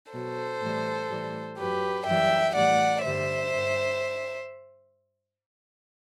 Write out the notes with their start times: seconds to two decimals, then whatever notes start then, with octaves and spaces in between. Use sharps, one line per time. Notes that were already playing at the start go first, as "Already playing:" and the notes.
0.13 B2 F#3 A4 C5
0.61 A2 E3 G3
1.09 A2 E3 G3
1.58 F#2 F#3 G4 B4
2.06 F#2 E3 G3 E5 G5
2.55 A2 E3 G3 D5 F#5
3.04 G2 D3 G3 C5 E5
3.53 G2